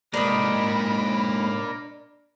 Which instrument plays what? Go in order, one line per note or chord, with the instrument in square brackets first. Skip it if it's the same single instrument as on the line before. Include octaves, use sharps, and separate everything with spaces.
[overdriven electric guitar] G#2 A#3 [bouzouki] D4 D#5 [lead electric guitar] A#4 D5 [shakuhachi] B5